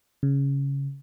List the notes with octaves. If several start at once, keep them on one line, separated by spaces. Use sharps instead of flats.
C#3